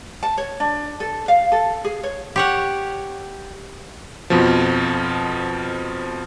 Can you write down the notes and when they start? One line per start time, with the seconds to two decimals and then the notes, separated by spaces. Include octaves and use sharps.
0.23 A5
0.38 C#5
0.60 D4
1.00 A4
1.28 F5
1.52 A4
1.84 G#4
2.03 C#5
2.36 G4 C#5 F#5
4.30 F2 B2 F3